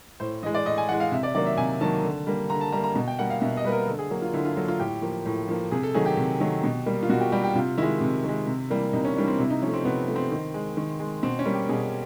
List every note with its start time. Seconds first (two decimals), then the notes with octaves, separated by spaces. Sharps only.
0.20 A2 C5
0.43 E3 D#5
0.46 G#3
0.55 D5
0.65 A2 D#5
0.78 G#5
0.89 E3 G#3 F#5
1.00 F5
1.12 C3 E5
1.23 D5
1.35 D#3 F#3 A#3 D5
1.46 E5
1.57 C3 G#5
1.81 D#3 F#3 A#3 A5
2.04 D3
2.27 G3 A#3
2.50 D3 A#5
2.61 A5
2.72 G3 A#3 A#5
2.84 A#5
2.95 B2
3.08 G5
3.19 G3 A#3 F#5
3.30 F5
3.42 B2 E5
3.57 D#5
3.65 G3 B4
3.69 A#3 A#4
3.87 D3 A4
3.99 G#4
4.11 F#3 A#3
4.22 F4
4.34 D3 E4
4.45 F4
4.57 F#3 A#3 A4
4.68 F4
4.79 A2 G4
5.02 F3 A#3
5.26 A2
5.49 F3 A#3
5.72 C3 G#4
5.83 A4
5.94 D#3 F#3 A3 G#4
6.06 G4
6.17 C3
6.40 D#3 F#3 A3
6.64 B2
6.86 G3 A#3
7.03 F4
7.09 B2 F#4
7.20 G4
7.32 G3 A#3 G4
7.44 G4
7.55 C3 F4
7.78 D#3 G#3 E4
8.01 C3
8.24 D#3 G#3
8.47 C3
8.70 E3 G3 A#3
8.93 C3 D#4
9.05 C#4
9.16 E3 G3 A#3 D4
9.28 C4
9.39 C3 E4
9.50 D#4
9.62 F3 C#4
9.66 A3
9.73 C4
9.85 C3 B3
10.08 F3 A3
10.16 C4
10.31 D#3
10.54 G#3
10.77 D#3
11.00 G#3
11.23 B2 C4
11.39 C#4
11.45 G3 A#3
11.54 G4
11.69 B2 G#4